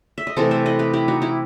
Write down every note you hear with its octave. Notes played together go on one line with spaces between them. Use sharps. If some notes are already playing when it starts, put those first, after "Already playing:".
E5
D#5
C3 E3 A3 A4 C5
C5 E5
B4 D#5
G4 B4
E4 G4
D#4 F#4
E4 G4